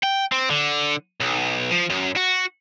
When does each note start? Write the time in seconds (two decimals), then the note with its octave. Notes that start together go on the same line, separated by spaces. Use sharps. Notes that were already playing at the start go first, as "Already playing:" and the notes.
0.03 G5
0.32 C4
0.50 D3
1.20 B1
1.70 F3
1.90 F#2
2.16 F#4